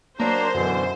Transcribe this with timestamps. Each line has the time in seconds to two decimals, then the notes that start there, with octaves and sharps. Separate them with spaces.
0.20 F#3 A#3 D4 C5 A#5
0.54 F#2 B2 D3 E3